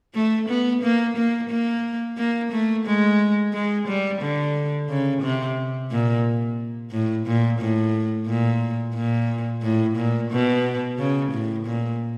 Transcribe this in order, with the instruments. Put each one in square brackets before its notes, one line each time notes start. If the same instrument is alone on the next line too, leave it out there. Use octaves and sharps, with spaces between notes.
[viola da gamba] A3
B3
A#3
A#3
A#3
A#3
A3
G#3
G#3
G3
D3
C#3
C3
A#2
A2
A#2
A2
A#2
A#2
A2
A#2
B2
C#3
A2
A#2